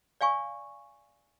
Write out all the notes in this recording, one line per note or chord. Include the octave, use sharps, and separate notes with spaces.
D5 F5 G#5 C#6